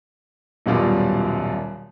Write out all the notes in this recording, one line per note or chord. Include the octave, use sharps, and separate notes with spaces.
D#1 F#2 B2 G3 F4 D5